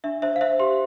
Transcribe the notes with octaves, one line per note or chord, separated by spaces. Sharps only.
D4 E5
C5 E5
F5
C5 E5
G4 C6